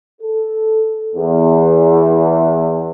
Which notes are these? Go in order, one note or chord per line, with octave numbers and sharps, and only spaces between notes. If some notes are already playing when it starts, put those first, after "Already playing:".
A4
E2